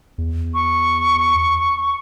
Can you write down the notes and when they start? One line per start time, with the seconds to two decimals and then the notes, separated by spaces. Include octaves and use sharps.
0.18 E2
0.54 C#6